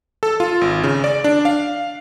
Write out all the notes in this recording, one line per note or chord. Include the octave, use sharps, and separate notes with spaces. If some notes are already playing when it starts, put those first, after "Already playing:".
A4
F4
G#1
C#3
D5
D4
F5